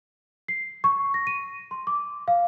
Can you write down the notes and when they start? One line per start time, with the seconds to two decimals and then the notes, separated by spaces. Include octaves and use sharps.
0.48 C7
0.84 C#6
1.14 A#6
1.27 D#7
1.71 C6
1.87 D6
2.28 F5